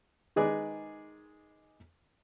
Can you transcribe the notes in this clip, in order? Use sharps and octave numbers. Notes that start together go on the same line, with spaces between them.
D#3 G#3 G#4 B4 D5